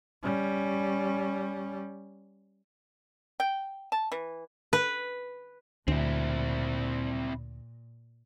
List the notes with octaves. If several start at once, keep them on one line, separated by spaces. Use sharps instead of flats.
G3 C#4
G5
A5
E3
B4
D2 A#2 C4 E4